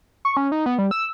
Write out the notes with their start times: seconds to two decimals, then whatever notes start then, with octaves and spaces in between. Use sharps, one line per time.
0.25 C#6
0.37 C#4
0.52 D#4
0.66 B3
0.78 G3
0.91 E6